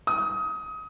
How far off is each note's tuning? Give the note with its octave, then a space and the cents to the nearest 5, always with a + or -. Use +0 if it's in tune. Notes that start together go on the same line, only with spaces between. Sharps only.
D#6 +25